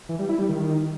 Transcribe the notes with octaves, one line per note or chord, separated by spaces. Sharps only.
E3
G3
E4
G3
D#3